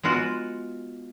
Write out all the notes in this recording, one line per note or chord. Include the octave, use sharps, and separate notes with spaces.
G#3 B3 F4 F#4